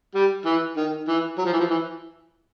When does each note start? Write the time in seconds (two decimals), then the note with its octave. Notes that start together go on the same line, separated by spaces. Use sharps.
0.14 G3
0.45 E3
0.76 D#3
1.08 E3
1.38 F#3
1.45 F3
1.53 E3
1.60 F3
1.70 E3